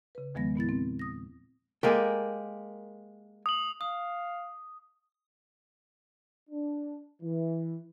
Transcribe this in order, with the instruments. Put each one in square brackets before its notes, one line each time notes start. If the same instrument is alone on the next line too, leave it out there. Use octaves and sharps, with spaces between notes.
[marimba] C#3 B4
E2 D#3 F3 G#3 B3 A#6
A#2 B3 E4 A6
C4
D#6 A#6
[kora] G#3 A#3 G4 [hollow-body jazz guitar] A4 A#4 G#5
[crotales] D#6 F#7
[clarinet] F5 [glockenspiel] D#6
[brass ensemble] D4
E3